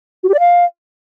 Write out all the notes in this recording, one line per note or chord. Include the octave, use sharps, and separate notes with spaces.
F#4
G4
D5
F5